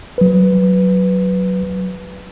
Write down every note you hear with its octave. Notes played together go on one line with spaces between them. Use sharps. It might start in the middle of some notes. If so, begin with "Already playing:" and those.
F#3 B4